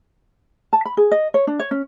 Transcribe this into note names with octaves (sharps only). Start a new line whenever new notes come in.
A5
B5
G#4
D#5
C#5
D4
C#5
C#4